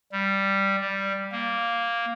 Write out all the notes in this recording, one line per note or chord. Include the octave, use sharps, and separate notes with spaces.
G3
G3
A#3